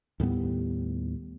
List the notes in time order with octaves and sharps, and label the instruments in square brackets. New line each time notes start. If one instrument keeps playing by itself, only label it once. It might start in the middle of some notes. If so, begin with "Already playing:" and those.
[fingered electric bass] D#2 A2 G3 B3